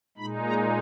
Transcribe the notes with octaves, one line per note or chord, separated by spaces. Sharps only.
A#2 G#3 D#4 B5
A#5